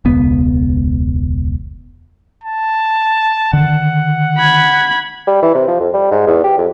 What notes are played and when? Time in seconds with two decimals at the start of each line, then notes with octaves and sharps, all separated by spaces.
0.05 E1 C#2 B3
2.43 A5
3.53 D3 D#3 F#5
4.37 B5 G#6
5.27 G3
5.43 E3
5.55 C3
5.68 F3
5.80 F2
5.94 G3
6.11 G#2
6.27 E2
6.44 G4
6.58 F2